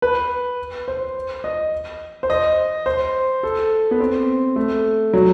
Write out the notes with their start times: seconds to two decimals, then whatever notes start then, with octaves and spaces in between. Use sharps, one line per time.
0.02 B4
0.88 C5
1.44 D#5
2.23 C5
2.30 D#5
2.86 C5
3.43 A4
3.91 B3
4.00 C4
4.56 A3
5.13 F#3